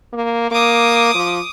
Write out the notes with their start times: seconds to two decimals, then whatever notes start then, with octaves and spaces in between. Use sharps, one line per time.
0.13 A#3
0.51 A#3 D6 D#6
1.14 F3